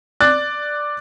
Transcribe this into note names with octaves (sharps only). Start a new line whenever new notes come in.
D5 F#6 A6